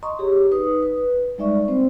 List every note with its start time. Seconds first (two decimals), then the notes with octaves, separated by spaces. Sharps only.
0.03 D#5 A#5 C6 C#6 D#6
0.19 G4 G#4 C#5
0.51 D#4 B4 D#6
0.83 B4
1.38 G3 G#3 D#4 D5 E5 C#6
1.68 A#3 C4 C5